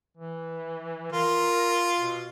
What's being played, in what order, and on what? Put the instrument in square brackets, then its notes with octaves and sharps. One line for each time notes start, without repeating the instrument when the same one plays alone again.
[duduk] E3
[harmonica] F4 [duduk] A#4
[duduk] B2